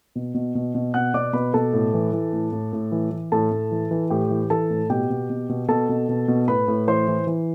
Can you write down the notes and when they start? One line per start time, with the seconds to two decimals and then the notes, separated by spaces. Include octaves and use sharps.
0.16 B2
0.35 B2
0.55 B2
0.75 B2
0.94 B2 F#5 F#6
1.14 B2 D5 D6
1.33 B2 B4 B5
1.54 B2 A4 A5
1.73 A2
1.94 E3
2.13 E3
2.33 A2
2.52 A2
2.73 A2
2.92 E3
3.11 E3
3.32 A2 A4 A5
3.51 A2
3.71 E3
3.91 E3
4.10 A2 G4 G5
4.30 E3
4.50 E3 A4 A5
4.70 A2
4.90 B2 G4 G5
5.10 B2
5.30 B2
5.49 B2
5.68 B2 A4 A5
5.89 B2
6.09 B2
6.28 B2
6.47 A2 B4 B5
6.68 A2
6.88 E3 C5 C6
7.07 E3
7.27 E3